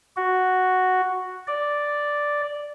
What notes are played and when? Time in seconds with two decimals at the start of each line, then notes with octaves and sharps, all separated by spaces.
0.17 F#4
1.47 D5